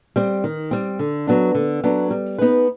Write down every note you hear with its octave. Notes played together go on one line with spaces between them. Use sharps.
G3 C4
D#3
G3 C4
D3
F#3 B3 D4
D3
F#3 B3 D4
G3
B3 D#4 G#4 B4